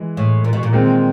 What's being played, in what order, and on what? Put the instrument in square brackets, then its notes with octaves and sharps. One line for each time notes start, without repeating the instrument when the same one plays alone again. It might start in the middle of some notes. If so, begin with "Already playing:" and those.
Already playing: [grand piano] E3 G#3
[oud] A2
A#2
B2
A#2
[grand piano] D#3 G#3 C4